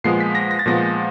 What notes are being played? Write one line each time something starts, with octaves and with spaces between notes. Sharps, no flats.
A#2 F3 G#3 B3 C7
B6
A#6
A#6
A6
A#2 F3 G#3 B3 A#6